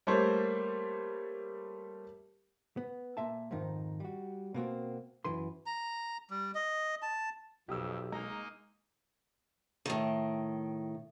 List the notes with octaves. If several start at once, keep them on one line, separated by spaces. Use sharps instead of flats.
G3 A3 A#3 C5 C#5
B3
A#2 E5 A5
F2 G#2 D#3 D#4
G3 F#4
B2 A#3 C4 F#4
F#2 E3 B4 C6
A#5
G3
D#5
A5
B1 F2 G4 D#6 E6
G#3 A#3 D#4 D#5 A#5
A2 D#3